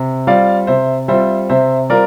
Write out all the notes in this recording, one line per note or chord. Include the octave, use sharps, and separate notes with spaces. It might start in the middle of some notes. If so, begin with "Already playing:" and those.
Already playing: C3
G3 C4 F4 D5 F5
C3 C5 E5
G3 C4 F4 C5 E5
C3 C5 E5
G3 C4 F4 A#4 D5